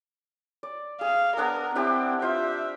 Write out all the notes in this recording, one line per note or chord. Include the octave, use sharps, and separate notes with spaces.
D5
G#4 F5
B3 D4 G#4 A#4
C4 D4 E4 G4
F4 C5 E5